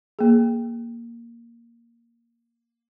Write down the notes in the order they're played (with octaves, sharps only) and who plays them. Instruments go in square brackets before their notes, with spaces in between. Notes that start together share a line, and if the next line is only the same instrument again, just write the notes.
[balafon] A#3 G#4